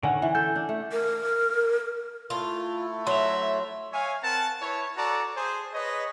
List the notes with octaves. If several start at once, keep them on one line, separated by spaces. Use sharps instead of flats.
D3 D#3 C#4 F#5
E3
A4 G6
D4
A3
A#4
A3 E4 F4 A4
F#3 E5 C6 F7
C#5 E5 F5 G#5
C4 A#4 F#5 A5
E4 B4 C#5
F#4 A4 D5 A5 A#5
G#4 C5
G#4 B4 C#5 D#5